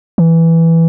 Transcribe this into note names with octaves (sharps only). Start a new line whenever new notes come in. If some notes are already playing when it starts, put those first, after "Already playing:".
E3